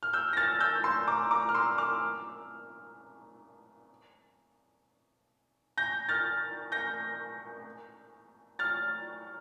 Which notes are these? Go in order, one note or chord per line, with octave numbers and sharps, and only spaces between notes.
F6
E6 G6
A#6
F6 A6
E6 G6
C6 E6
A#5 D6
A#5 D6
F6
C6 E6
D6 F6
G6 A#6
F6 A6
G6 A#6
F6 A6